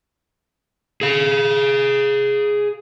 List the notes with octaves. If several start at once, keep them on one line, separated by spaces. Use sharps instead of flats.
G#4 F5